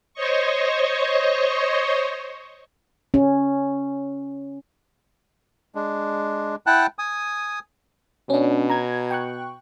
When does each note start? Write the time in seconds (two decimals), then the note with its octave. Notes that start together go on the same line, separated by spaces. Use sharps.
0.14 C5 C#5 D#5 C#6
3.14 C#4
5.75 G#3 D4
6.66 E4 F#5 G5 A5 F#6
6.99 G#5 D#6
8.30 B2 C#4 D4
8.69 A#5 G#6
9.11 G5 C#6 F#6